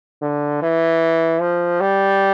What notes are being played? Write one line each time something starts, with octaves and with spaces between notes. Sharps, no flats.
D3
E3
F3
G3